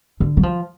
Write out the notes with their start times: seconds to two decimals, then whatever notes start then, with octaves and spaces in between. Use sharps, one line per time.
0.20 D3
0.37 F#3
0.43 F3